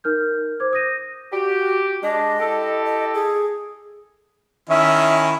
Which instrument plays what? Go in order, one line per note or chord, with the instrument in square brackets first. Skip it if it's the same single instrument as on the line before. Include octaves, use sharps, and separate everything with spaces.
[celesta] D#4 A#4 F6 G6
C5 D6 G#6
D#6 G6 A#6 D#7
[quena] F#4 [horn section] G4
[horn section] G#3 D4 [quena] D#5
[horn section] E4 G4 A4
[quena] D#5
G#4
[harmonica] D#3 C#4 E4 [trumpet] E5